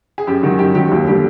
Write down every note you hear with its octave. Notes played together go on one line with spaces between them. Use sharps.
G#4
F#2 G4
D#3 F#3 F#4
F#2 G4
D#3 F#3 G4
D#2 G4
D3 G3 G4